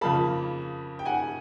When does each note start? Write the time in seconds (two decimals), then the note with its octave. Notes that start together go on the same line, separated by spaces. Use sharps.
0.01 F2 C#3 F3 A#3 A5 B5
0.99 G5
1.06 F#5 G#5